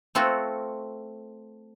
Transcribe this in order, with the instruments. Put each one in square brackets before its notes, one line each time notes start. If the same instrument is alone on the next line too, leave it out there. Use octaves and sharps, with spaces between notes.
[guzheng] A3 C4 F4 F#4